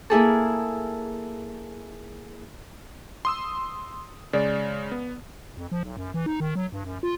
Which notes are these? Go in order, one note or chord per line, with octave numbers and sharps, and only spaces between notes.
A#3 E4 G#4 A4
C6 D#6 E6
C#3 G#3 D5
B3
F2
F3
B1
F#2
E3
D#4
D#3
F#3
G2
F#2
F4